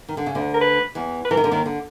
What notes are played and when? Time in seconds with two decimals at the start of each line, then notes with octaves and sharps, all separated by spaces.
0.09 D#3
0.17 D3
0.26 C#3
0.35 D2 D3
0.54 A#4
0.61 B4
0.95 E2 E3
1.25 B4
1.31 E3 A#4
1.37 D#3
1.44 D3
1.51 D#2 D#3
1.66 D3